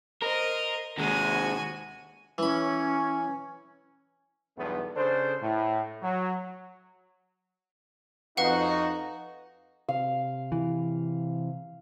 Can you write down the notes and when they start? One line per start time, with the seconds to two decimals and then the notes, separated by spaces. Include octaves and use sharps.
0.22 A#4 C5 D#5
0.98 D#2 G#3 F#4 G#5
2.38 E3 C#4 B5
4.58 B1 E2 G2 A3 B3
4.96 C#3 D4 A4 C5
5.42 A2
6.03 F#3
8.37 F2 D#4 F#4 B4 F5 F#5
9.89 C3 F5
10.52 E3